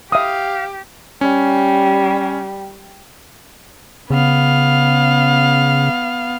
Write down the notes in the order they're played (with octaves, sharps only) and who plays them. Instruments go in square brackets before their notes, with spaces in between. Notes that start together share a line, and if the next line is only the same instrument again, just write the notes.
[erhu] G4 [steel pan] E5 D#6 [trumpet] F5
[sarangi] G3 [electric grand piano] C#4
[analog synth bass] C#3 [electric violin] B3 F5